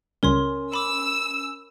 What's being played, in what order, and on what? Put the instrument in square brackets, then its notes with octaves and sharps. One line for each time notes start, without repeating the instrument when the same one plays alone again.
[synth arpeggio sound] C#2 C#3 G3 [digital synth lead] C#4 [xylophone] A#4 C#5 C6
[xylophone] B5 D6 [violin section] E6